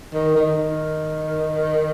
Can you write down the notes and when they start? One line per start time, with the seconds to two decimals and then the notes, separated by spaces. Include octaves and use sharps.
0.14 D#3
0.36 D#3